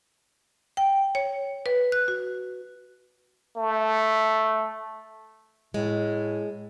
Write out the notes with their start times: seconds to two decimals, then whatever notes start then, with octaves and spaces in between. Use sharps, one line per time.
0.77 G5
1.15 C#5
1.66 B4
1.92 F#6
2.08 F#4
3.57 A3
5.74 A2 G#3